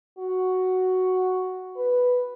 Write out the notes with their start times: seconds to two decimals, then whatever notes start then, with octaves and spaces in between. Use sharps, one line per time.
0.18 F#4
1.76 B4